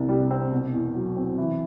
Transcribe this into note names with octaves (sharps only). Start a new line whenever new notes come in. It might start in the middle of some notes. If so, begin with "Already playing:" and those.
Already playing: C2 C3 D4
G3
C4
B2
E2
F#3
C4
E3